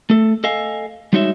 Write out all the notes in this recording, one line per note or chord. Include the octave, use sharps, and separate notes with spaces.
A3 A4
A4 D#5 F5 G#5
G3 G#3 D#4 F#4 C#5 E5